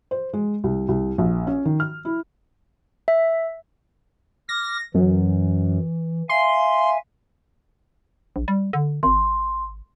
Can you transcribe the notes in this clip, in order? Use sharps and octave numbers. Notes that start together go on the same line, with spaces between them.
C5
G#3
C2
C2
A#1
C#4
D#3
F6
E4
E5
D6 F6 A#6
F#2 E3
E5 F5 G#5 C6
A#1
G3
D3
G#1 C6